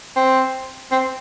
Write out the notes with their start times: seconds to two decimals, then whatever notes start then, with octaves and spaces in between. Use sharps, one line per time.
0.16 C4
0.92 C4